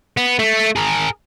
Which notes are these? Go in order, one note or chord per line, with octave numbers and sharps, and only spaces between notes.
B3
A3
G#4 A#4